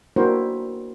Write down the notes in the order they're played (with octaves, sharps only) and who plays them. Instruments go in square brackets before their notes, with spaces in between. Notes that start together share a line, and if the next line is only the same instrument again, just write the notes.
[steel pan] A#3 D4 E4 F#4 A#4 C5